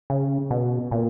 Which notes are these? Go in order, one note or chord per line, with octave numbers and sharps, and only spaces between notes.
C#3
B2
A#2